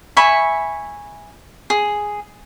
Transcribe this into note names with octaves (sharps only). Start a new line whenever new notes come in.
E5 G#5 B5 C#6
G#4